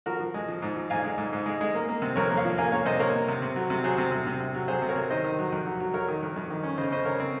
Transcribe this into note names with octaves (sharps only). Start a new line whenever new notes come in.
F3 F#4 A#4
F3
G#3
F3
G#2
F3
G#2 F5 G#5
G#3
G#2
G#2
G#3
G#3
A#3
A#3
C3
F2 A#4 C#5
A#3
C#5 F5
F3
A#3 F5 G#5
A#3 C#5 F5
C3 C5 D#5
A#3 A#4 C#5
A#3
C3
C3
F#3
C3
F#3 G#4 C5
C3
C3
C3
C3
F#3
F#3 G#4 C5
C3
A#4 C#5
C3
D#3 C5 D#5
D#3
F#3
F2
F#3
F#3
F#3 A#4 C#5
D#3
F2
F2
D#3
C#4
C#3 C5 D#5
C#3 C5 D#5
C#3 A#4 C#5
C4